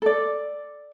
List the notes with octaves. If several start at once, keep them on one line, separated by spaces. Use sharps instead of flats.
A4 D5